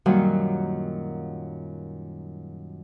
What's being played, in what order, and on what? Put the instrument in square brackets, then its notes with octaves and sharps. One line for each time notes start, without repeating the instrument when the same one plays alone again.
[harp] F#2 A#2 D#3 F#3 G3